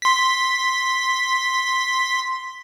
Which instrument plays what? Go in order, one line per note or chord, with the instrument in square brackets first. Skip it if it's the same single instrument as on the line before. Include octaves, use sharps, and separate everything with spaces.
[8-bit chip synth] C6 B6